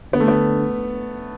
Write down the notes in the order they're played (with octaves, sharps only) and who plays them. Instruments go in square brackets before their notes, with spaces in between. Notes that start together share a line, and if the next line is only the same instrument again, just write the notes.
[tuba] D3 [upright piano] B3
[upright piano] A3
B3